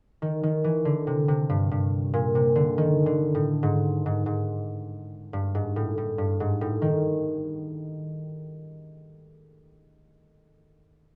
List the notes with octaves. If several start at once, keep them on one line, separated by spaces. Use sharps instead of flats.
D#3
D#3
E3
D3
C3
C3
G2
G2
A#2
C3
D3
D#3
D3
A2
G#2
G#2
G#2
G2
G#2
A2
A2
G2
G#2
A2
D#3